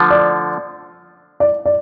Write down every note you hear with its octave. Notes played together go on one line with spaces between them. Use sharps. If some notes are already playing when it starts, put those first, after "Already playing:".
Already playing: D3 F3 A3
D5
D5
D5